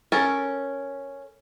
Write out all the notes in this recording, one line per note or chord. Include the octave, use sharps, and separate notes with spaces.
C#4 A4 A#4